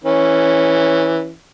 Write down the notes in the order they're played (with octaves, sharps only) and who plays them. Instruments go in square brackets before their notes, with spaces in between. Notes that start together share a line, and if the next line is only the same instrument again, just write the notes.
[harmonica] E3 C#4